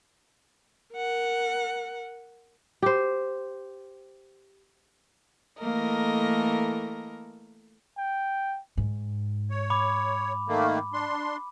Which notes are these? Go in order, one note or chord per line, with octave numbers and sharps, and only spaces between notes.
A#4 F#5
G4 C5
E3 A3 A#3 A4 A#4 D#5
G5
G#2
C#5
B5 D6
D#3 A3 A#3
D4 C6